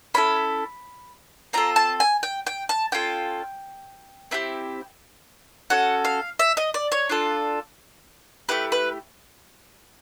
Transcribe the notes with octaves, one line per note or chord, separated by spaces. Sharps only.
C#4 E4 A4 B5
C4 F4 A4 A#5
A5
G#5
G5
G5
A5
C#4 F4 A4 G5
C4 E4 G4
C#4 F#4 A4 F#5
F5
E5
D#5
D5
C#5
D4 F4 A4
A3 C4 E4 G4 B4
B4